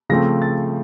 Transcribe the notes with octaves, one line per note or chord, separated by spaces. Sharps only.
C#3 F3 A3 C4 A#6
A6